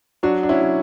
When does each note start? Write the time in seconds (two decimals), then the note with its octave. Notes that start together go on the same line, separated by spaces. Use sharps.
0.23 F#3 D4 F#4
0.43 D4
0.49 C#4 E4
0.61 F#3